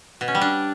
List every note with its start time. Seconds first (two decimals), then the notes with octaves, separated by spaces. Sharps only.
0.21 B2
0.28 C#4
0.35 G3
0.41 D4